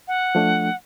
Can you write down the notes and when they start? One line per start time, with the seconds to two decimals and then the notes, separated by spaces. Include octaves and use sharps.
0.08 F#5
0.35 F3 A3 D4